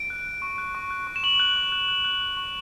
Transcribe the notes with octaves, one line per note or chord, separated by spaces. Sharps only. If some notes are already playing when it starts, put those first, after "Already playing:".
Already playing: D7
F#6
F#6
C#6
F#6
C#6
F#6
C#6
E7
C#6 F#7
F#6
C#6
F#6
F#6
F#6
F#6
C#6